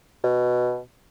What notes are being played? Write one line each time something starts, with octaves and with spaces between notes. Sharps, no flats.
B2